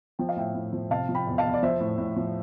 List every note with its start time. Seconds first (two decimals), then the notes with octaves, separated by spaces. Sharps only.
0.19 F3 G5
0.29 F5
0.36 A2 E5 G5
0.55 A2
0.73 F3
0.90 C3 F5 A5
1.09 F3
1.15 G5 B5
1.27 E2
1.38 F5 A5
1.44 E2
1.54 D5
1.63 F3 C5 E5
1.80 A2
1.98 A2
2.16 F3